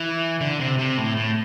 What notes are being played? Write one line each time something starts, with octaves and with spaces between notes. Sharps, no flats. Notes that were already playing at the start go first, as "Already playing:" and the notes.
Already playing: E3
D3
C3
C3
A2
A2